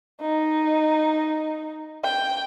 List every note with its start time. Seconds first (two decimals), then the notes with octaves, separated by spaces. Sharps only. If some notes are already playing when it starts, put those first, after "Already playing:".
0.21 D#4
2.03 G5